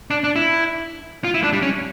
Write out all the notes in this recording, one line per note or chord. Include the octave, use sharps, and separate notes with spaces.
D4
D4
E4
F4
E4
D4
G3
C#4